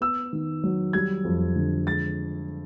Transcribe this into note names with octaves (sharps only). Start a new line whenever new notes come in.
B3 E6
D#3
F#3
G3 G#6
F2
D3
G#3 A6